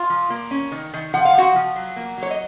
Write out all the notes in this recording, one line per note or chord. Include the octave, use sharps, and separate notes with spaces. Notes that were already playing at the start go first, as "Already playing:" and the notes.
Already playing: F4 F5
F3
A#3
C#4
D#3
D#3
F3 F#5
F5
F3 F#4 F#5
F3
F#3
A#3
F#3 C#5
D#5